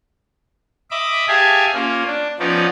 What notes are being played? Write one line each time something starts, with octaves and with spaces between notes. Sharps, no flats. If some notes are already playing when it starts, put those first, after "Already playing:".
D#5 E5 B5 D6
G4 G#4 E5 F5 G#5 A5
A#3 C#4 F4
D4
F3 B3 C#4 D#4 D5